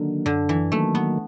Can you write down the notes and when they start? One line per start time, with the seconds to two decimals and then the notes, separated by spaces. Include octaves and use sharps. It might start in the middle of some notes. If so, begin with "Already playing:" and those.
Already playing: D3 D#3 F#3 A#3
0.26 F#2 D3
0.49 E3
0.72 D#3 F#3 A3 A#3
0.95 B3